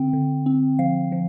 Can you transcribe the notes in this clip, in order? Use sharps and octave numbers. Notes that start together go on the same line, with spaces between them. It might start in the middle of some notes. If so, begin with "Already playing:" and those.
Already playing: D3 C4 G5
D3
C4
F3 F5
F3